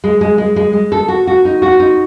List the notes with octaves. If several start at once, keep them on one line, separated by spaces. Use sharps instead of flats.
G#3
G#3
G#3
G#3
G#3
A4
F#4
F#4
D#4
F#4
D#4